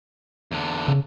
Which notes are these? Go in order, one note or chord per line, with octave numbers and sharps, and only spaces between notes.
E2 D3
C#3